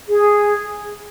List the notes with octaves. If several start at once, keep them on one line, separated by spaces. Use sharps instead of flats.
G#4